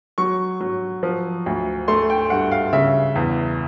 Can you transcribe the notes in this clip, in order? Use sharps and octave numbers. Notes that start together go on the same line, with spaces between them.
F#3 C#6
F#3
F3
D2
A3 C6
G5
G2 F#5
F5
C#3 E5
E2